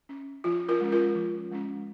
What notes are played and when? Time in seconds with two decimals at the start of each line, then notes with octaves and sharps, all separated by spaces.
0.09 C#4
0.44 F3 F4
0.69 F4 A#4
0.81 G#3 C#4
0.92 F4 A#4
1.15 F3
1.52 G#3 C#4